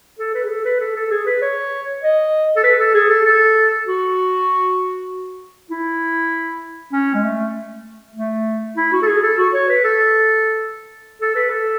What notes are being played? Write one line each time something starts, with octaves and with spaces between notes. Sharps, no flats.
A4
B4
G#4
A4
B4
A4
A4
G#4
B4
C#5
D#5
A4
B4
A4
G#4
A4
A4
F#4
E4
C#4
G#3
A3
A3
E4
F#4
A4
G#4
A4
F#4
C#5
B4
A4
A4
B4
A4